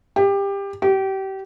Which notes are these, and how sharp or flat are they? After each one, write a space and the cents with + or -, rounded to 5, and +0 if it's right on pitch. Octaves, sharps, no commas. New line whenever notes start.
G4 +20
G4 -30